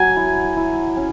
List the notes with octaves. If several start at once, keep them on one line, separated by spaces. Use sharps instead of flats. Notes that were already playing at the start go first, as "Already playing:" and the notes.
Already playing: F#3 G#5
E4
E4
C#4